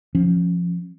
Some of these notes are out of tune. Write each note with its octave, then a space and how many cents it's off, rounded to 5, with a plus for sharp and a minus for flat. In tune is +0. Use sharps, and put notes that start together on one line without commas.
F3 +0 C#4 -20